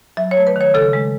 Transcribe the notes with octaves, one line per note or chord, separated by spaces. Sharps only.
F#3 E5
C#5
A3
B4
D#3 C#5
C#3 A4
G#3